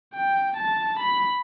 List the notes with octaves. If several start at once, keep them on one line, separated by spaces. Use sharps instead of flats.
G5
A5
B5